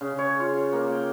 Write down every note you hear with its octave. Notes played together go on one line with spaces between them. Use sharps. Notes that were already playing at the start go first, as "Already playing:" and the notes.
C#3
C#5
F4
A#3
G5